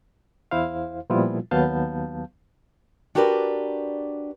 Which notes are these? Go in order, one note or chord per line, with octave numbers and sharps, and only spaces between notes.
E2 E4 C5 F5
A#2 F3 G3 B3 E4 F4
D#2 F#3 B3 F5 A5 G6
D4 F#4 G4 A#4 B4 D5